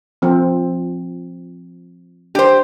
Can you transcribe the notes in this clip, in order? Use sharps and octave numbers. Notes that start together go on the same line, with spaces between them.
F3 C4
D4 G4 C5